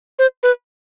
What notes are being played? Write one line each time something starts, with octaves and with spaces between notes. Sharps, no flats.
C5
B4